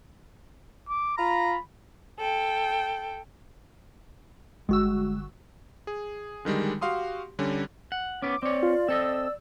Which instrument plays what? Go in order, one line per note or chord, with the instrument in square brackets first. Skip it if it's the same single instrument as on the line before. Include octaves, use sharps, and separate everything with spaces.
[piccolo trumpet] D6
[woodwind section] F4 A#5 [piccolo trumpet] B5
[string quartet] A4 G5
[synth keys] G1 F#4 E6 [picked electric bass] G#3
[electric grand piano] G#4
D3 D#3 G3 G#3
F#4 G4 F5 C6 D#6
D3 G3 C#4
[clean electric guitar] F#5
[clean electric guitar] B3 C#4 [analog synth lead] D6
[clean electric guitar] C4 C#5 [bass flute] D5
[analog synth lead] F4
[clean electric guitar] C4 A4 D#5 [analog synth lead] E6